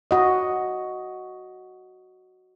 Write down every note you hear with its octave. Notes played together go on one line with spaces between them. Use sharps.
F#4 D#5